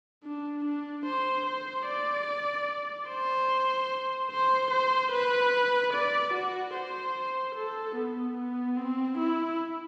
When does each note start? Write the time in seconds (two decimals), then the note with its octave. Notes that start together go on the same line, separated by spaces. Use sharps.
0.24 D4
0.64 D4
1.06 C5
1.46 C5
1.87 D5
3.09 C5
4.31 C5
4.71 C5
5.12 B4
5.93 D5
6.33 F#4
6.74 C5
7.55 A4
7.96 B3
8.37 B3
8.77 C4
9.18 E4